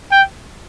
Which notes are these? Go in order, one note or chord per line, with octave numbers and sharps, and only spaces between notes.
G5